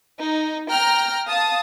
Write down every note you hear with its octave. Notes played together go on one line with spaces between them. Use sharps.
D#4
G5 A#5 F6
F5 A5 D#6